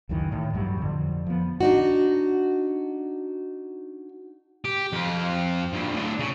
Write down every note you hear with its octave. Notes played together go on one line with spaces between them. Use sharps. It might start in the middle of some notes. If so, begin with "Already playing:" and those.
C#2 F#2 D#3 E3
A2 D#3
A1 G2 F#3 G3
F2 D3
F3 B3
D4 D#4 F#4
G4
F2 F4
G2 A#2
A2 D4
C#3